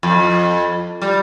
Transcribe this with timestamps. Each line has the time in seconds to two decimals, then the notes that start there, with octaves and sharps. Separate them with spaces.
0.03 F2
1.02 G3